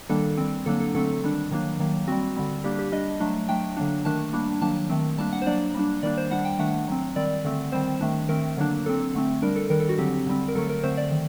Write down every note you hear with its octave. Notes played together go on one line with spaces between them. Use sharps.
D#3 G3 A#3 D4 A4
G3 C4
D3 F#3 A#3 D4 A4
A4
D3 F#3 A3 C4 A4
D#3 G3 D4
D#3 F#3 A#3 D4
D#3 F#3 A#3
G3 C4 F#4
D3 G3 C4
G3 A#3 D4 G4
G4
G3 D4 D#5
F#3 A3 D4
F#3 A3 D4 G5
D3 F#3 A#3 D4
D#3 A3 D4 A5
G3 A#3 D4
D#3 F#3 A#3 D4 A5
D#3 A3 C4
G3 A#3 D4 A5
F#5
C5
F#3 A#3 D4 D5
G3 A#3 D4
D#3 G3 A#3 D4 D5
C5
G3 D4 F#5
G5
D#3 A3 D4 F#5
F#3 C4
D#3 G3 C4 D5
D3 A3 C4
D#3 G3 C4 C5
D#3 A3 D4
D#3 A3 C4 A#4
D3 F#3 A#3 D4
F#3 C4 A4
D3 A3 C4
G3 D4 A#4
A4
D#3 G3 D4 A#4
A4
F#4
D3 F#3 C4 G4
D3 G3 C4
A#4
D3 F#3 A3 A4
A#4
D3 A3 C4 C5
D5
D#3